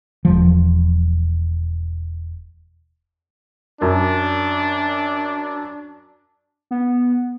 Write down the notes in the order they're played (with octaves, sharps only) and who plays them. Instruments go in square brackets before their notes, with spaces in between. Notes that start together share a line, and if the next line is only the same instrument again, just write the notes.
[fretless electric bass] E1 F3
[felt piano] F#2 A#4 [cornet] D4
[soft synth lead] B3